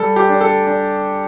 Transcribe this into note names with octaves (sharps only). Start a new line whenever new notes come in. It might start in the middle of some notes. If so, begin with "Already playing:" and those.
Already playing: G3 A4
G4
D4
A4
D4